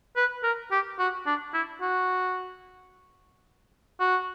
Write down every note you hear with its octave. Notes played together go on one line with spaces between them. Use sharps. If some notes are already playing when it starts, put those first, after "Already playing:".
B4
A#4
G4
F#4
D4
E4
F#4
F#4